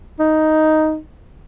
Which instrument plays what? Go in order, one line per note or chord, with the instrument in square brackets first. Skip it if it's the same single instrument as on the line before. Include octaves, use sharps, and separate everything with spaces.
[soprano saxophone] D#4